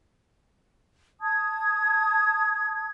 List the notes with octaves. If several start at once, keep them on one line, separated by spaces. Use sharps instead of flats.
A5 D#6 G#6